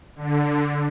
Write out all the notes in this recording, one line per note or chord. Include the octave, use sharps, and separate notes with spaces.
D3